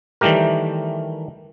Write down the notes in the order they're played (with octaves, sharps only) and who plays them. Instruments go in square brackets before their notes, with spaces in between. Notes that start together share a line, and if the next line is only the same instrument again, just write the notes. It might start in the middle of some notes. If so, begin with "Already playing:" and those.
[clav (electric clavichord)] D#3 E3 G3 A3 G4 A#4